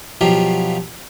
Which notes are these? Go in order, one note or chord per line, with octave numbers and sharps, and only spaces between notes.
B2 F3 F#3 F4 G4